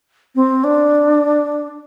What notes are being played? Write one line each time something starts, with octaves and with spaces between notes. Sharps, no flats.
C4
D4